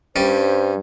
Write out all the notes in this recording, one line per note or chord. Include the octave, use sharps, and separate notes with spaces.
G2 G3 C#4 C5